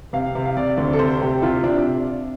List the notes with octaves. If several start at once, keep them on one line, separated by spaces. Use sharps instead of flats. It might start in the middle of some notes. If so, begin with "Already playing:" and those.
C3 F5
C3
F5
C3 D5
D2
A4
C3 C5
C3 G4
C3 F4
C3 D4